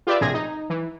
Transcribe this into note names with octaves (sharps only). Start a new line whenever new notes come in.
F4 G4 B4 D5 E5
A#1 A2 C3 G#4 G#6 A#6
D#4
E3